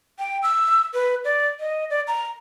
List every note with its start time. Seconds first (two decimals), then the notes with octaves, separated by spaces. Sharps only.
0.19 G5
0.43 E6
0.94 B4
1.24 D5
1.60 D#5
1.90 D5
2.08 A#5